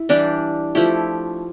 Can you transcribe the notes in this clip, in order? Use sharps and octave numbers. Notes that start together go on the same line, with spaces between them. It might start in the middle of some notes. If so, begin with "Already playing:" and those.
Already playing: E4
E3 G3 D4 G4
F3 A3 E4 G4